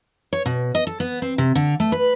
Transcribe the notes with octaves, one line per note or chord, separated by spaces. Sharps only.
C#5
B2
D#5
A4
B3
C4
C3
D3
A3
B4